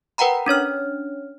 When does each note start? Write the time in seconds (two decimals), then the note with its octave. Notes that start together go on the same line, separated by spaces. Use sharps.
0.18 A#4 B4 F#5 G5 A#5 B5
0.46 C#4 D4 C#5 F6